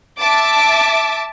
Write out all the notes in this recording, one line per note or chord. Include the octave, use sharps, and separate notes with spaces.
E5 A5 D6